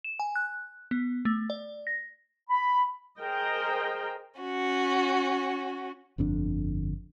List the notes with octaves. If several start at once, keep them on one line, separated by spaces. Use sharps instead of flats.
E7
G#5
F#6
B3
A3
D5
A#6
B5
G#4 A#4 C5 D#5 G5
C#4 F#4
G1 F2 D3 D4